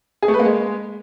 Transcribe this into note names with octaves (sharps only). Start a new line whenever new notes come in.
G#4
A3
B4
A#3
G#3